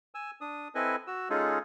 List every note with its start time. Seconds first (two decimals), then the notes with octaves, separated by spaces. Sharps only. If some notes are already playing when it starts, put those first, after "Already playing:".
0.15 G#5 E6
0.41 D4 D#6
0.75 C4 E4 A4 B4 D#5 G#5
1.07 F#4 E6
1.30 G#3 C#4 D#4 F4 G#4 A4